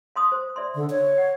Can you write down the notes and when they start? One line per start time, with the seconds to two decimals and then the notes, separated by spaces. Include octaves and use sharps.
0.16 F5 C6 D#6
0.32 C5
0.56 D5 E5 C6
0.75 D3
0.90 C#5
1.18 F#5